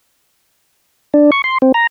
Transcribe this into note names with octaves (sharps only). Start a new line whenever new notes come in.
D4
C#6
C6
C4
A#5